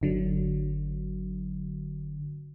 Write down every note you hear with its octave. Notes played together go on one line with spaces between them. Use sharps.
G1 D3 F#3